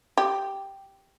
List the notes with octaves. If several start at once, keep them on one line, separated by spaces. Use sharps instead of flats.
G4